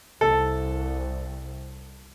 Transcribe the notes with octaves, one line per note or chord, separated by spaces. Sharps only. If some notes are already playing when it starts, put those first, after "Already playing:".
C2 A4